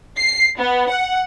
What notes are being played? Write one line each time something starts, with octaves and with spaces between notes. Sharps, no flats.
C7
B3
F#5